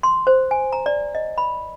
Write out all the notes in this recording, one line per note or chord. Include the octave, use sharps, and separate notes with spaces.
C6
C5
G#5
A#5
D5
D#5
B5